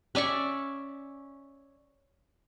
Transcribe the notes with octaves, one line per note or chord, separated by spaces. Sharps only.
C#4 D5 E5 C#6